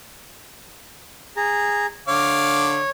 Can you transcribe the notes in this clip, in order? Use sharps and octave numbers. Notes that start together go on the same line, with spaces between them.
G#4 A#5
D3 C#5 F5 D6